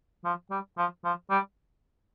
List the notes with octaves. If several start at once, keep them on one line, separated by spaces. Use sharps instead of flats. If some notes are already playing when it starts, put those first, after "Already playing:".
F3
G3
F3
F3
G3